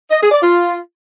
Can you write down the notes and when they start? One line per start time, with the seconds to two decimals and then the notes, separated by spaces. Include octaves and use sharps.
0.11 D#5
0.21 G#4
0.31 D5
0.42 F4